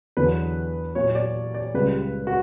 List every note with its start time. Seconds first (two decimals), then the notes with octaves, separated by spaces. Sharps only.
0.17 E2 D3 F#3 B4
0.95 A#2 F#3 C#5
1.15 D5
1.54 D5
1.74 C#2 C#3 G3 B4
2.27 F#4